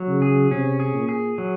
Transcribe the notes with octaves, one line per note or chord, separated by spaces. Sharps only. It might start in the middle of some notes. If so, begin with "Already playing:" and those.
Already playing: F#3
C#3
G#4
C3 C#4
G#4
A#2
G#4
F#3